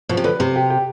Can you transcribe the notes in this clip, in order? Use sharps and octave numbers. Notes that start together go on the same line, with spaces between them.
B2 F3
C3
D3 B4
C3 C4
G4
G4